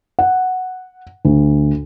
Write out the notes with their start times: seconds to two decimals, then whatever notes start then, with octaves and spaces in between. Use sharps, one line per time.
0.19 F#5
1.25 D2